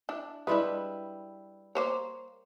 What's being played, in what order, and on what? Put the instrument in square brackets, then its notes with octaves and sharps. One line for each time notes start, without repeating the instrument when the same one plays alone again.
[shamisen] D4 E4
[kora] G3 E4 B4 [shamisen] G#3 D4
[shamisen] A#3 C5 C#5